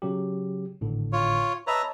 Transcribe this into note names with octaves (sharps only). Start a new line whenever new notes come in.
C#3 F#3 G4
G#1 A2 D3
F4 C#5
B4 C#5 D#5 E5 A5 A#5